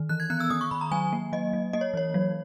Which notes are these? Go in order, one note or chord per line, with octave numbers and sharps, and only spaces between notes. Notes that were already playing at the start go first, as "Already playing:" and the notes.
Already playing: D#3
E3 F#6
G#6
B3 F#6
E6
D#3 D#6
C#6
D#3 B5
A#5
F#3 G#5
A#3
F#3 D#5
F#3
A#3 D#5
C#5
E3 C#5
F#3